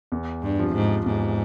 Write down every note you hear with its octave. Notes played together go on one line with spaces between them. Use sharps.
E2
G2
C3 F3
G#2
E2 G#2